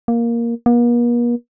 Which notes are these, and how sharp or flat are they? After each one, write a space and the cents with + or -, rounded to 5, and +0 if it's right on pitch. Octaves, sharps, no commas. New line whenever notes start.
A#3 +5
A#3 +45